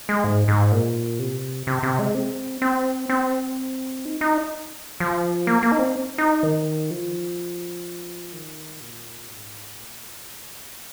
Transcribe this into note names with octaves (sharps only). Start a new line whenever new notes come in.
G#3
G#2
G#2
A#2
C3
C3
C3
G#3
C4
C4
C4
D#4
D#4
F3
A#3
A#3
D#4
C4
D#4
D#3
F3
D#3
A#2
G#2
A#2
C3
D#3